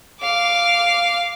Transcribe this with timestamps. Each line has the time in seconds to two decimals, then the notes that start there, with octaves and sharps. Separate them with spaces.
0.21 F5 D6